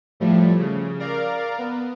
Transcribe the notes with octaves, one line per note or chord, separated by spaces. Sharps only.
A2 F3 G3 A3
C#3
A#4 D5 F5 A#5
B3